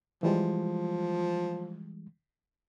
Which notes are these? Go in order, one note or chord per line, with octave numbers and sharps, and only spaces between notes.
E3 F3 G3 G#3